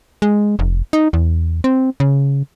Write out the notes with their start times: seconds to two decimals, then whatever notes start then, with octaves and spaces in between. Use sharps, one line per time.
0.22 G#3
0.59 F1
0.93 D#4
1.13 E2
1.64 C4
2.00 C#3